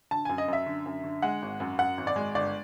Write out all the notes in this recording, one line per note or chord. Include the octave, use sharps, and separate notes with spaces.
D3 A5
F#2 G#5
D#5
F#2 E5
D3
F#2
D3
G#3 F#5
G#1
F#2
F#2 F#5
G#1
D5
G#3
G1 D5